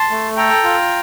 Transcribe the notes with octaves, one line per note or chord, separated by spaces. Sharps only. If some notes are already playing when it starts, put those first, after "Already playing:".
Already playing: A5 C6
A3
A4 G5 A#5
F4